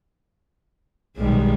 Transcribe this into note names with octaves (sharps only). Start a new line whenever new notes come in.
B1 D#3 G3 G#3